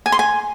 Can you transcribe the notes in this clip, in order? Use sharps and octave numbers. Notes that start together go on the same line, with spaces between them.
G#5
C6
G#5